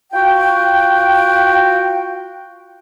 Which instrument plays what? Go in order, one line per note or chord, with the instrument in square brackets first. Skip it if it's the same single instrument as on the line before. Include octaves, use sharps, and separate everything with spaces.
[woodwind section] F4 F#4 G5